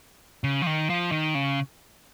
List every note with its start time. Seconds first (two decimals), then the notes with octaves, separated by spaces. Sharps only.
0.44 C#3
0.62 F3
0.66 D#3
0.90 F3
1.12 D#3
1.35 C#3